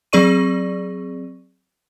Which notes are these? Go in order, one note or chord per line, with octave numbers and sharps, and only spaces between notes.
F#3 C4 G#4 D5 C#6 D#7